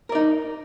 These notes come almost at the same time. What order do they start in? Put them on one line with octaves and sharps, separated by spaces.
A#4 D5 D#4